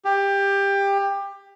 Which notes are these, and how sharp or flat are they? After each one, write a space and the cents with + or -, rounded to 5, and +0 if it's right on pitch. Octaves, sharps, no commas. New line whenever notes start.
G4 +20